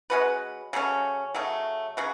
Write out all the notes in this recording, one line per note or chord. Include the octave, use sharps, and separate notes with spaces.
G#3 C#4 F#4 B4
C#3 F#3 A3 C#4
C#3 F#3 A3
C#3 F#3 F#4